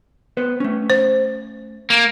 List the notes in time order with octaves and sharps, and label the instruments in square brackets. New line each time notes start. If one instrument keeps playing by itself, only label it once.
[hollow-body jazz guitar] B3 B4 C5
A3 C#4
[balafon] C5
[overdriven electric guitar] A#3